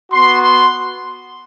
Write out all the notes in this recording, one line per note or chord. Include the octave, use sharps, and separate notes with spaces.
B3 F#4 C6
C6